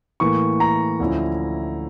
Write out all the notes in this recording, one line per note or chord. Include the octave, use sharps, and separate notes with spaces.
A2 E3 A#3 C#6
A#5
D2 D3 F3 C#4 E4